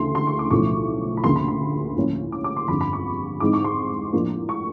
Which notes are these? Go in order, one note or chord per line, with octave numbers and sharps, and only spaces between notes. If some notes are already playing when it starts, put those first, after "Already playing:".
Already playing: D2 C#3 E3 A3 C6
C6
C#6
D6
B1 A2 F3 A3 C#4 C#6
B5
D2 C#3 F3 A#3 C6
B5
C6
A2 F3 A#3 C#4
D6
D6
C6
G1 F2 D3 B5
B5
C#6
G#2 E3 G#3 C4 D#4 D6
C#6
C6
A2 F3 A#3 D4
C#6